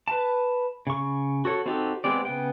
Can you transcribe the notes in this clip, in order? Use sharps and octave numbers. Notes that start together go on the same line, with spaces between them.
B4 A5
C#3 C#6
F#4 A4 C#5
C4 D#4 F#4 G4 A4
G#3 B3 C4 G4 D5
C#3 B3 G5